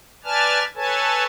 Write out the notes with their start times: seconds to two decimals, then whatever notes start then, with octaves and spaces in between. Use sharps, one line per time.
0.24 B4 D5 G#5 A5 F6
0.76 A4 B4 C#5 G#5 A5